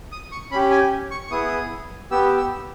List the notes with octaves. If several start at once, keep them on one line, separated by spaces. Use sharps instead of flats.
D#6
C#6
C#4 G4 B5
G#5
C#6
C#6
B3 E4 G#4 D#6
B3 G4 E6
E6